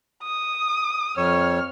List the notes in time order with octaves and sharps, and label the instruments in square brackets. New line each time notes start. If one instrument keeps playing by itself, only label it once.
[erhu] D#6
[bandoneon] F2 C#5 [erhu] F6